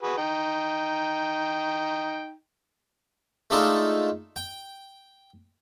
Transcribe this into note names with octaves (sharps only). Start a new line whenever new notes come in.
F#4 G#4 B4
D#4 G5
G#3 A3 D4 D#4 F4 A4
G5